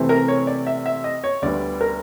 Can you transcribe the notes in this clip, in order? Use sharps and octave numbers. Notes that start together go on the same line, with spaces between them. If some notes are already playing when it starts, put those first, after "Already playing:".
Already playing: C3 E3 A3 C4
A#4
C#5
D5
E5
E5
D#5
C#5
D2 D3 G3 B3 D5
A#4